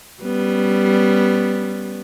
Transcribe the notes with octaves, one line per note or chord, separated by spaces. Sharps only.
G3 B3 C#4